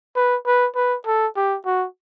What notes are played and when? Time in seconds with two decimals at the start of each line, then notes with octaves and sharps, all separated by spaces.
0.16 B4
0.46 B4
0.75 B4
1.06 A4
1.36 G4
1.65 F#4